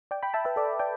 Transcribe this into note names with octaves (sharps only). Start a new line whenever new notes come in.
D5 G5
G5 B5
E5 A5
B4 E5
A4 D5
D5 G5